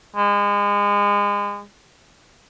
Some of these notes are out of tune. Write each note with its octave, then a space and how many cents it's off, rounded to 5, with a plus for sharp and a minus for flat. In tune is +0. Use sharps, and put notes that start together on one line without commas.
G#3 -30